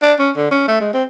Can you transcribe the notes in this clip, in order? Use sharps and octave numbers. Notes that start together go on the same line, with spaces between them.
D4
C#4
D3
C#4
A3
G#3
C4